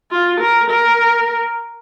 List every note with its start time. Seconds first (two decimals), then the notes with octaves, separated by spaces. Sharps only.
0.11 F4
0.41 A#4
0.71 A#4